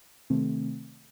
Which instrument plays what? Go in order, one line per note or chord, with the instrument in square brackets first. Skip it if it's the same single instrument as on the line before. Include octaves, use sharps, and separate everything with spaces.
[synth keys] C3 D#3 A3 C4